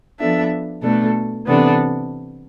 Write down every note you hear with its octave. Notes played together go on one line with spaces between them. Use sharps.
F3 B3 D4 A4 E5
B2 A3 D4 A4
C3 E3 B3 D4 A4